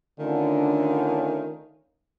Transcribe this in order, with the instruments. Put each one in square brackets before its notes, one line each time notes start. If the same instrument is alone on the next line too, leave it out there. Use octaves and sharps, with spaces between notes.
[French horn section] D3 [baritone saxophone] D#3 [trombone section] A3 C#4 F4